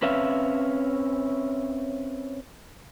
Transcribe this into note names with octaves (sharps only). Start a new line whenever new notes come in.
C4 C#4 B4 C#5 E5 F5